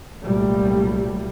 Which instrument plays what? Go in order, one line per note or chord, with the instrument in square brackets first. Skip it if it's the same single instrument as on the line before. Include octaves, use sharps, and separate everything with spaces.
[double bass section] C2 A#2 F#3 G3 A3